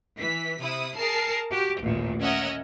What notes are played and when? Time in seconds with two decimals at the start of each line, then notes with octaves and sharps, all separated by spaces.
0.18 E3 B6
0.61 C3 E4 D#6
0.96 G#4 A#4 A5 C7
1.51 F#4 G4
1.81 A1 D#2 A#2
2.21 C#4 A#4 D#5 E5 F#5